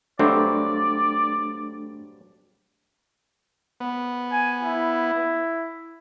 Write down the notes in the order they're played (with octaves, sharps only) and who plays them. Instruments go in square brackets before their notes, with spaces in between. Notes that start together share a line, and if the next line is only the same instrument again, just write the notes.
[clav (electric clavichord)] G2 F#3 C4 [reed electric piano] A3 D4 [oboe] D5
[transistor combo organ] B3
[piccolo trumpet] G#5
E4